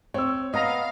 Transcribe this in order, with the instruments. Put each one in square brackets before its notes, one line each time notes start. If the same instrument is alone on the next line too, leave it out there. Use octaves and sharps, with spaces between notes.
[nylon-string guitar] C4 [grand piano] C#5 E6
[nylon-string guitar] B3 [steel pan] D#5 A#5 [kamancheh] F5